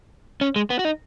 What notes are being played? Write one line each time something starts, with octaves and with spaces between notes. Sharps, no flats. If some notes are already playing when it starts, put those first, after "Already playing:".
C#4
G#3
B3
F#4
D#4